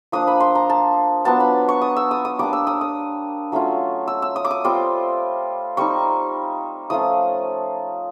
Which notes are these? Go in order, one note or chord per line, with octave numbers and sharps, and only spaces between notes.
F3 A#3 D4 D#6
B5
C6
A#5
A5
F#3 B3 D4 F4 A5
B5
C#6
D#6
E6
D#6
D#6
G3 A#3 D4 D6
E6
D#6
D#6
F#3 A3 C#4 F4
E6
E6
D#6
D6
D#6
G3 C4 F4 D6
G3 C4 D#4 C#6
F3 A3 C#4 F4 D#6